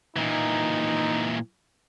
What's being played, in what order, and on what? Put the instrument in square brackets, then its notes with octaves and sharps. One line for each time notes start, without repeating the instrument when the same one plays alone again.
[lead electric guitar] A#2 E3 [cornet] D#4